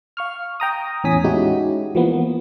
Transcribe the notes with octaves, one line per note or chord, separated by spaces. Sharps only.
F5 C#6 F6
G5 A#5 D#6
E2 A2 C#4 G#5 D#6 B6
G#3 C#4 D#4 E4 F#4 G4
E3 F3 A#3 B3